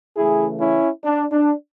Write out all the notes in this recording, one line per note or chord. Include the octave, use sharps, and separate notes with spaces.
C#3 E3 A3 E4 G#4
C#4 E4
D4
D4